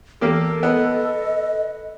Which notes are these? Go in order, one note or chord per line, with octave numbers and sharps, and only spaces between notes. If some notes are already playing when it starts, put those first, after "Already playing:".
E2 A#3 G4 A4
B3 D#5